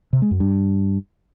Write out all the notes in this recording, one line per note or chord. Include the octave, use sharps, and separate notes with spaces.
C3
G#3
F#2
G2